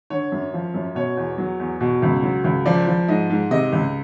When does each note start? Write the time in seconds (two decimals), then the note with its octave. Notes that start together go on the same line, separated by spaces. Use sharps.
0.10 D3 C#5
0.32 F#2
0.53 F3
0.74 F#2
0.95 B2 C#5
1.17 E2
1.38 F#3
1.60 E2
1.81 B2
2.02 C#2
2.23 F#3
2.44 C#2
2.66 F3 D5
2.87 F3
3.08 G#2 D#5
3.30 G#2
3.51 C3 D#5
3.72 C#2